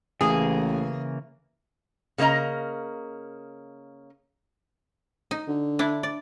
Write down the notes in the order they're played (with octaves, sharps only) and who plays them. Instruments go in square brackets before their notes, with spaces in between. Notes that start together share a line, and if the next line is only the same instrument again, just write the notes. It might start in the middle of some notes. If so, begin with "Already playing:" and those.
[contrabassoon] A1 [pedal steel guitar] C#3 E3 A#3 [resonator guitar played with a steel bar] G#4
[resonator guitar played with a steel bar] C#3 A#3 D#4 D#5 A#5
[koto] D#4
[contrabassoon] D3
[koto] D4 E4
D5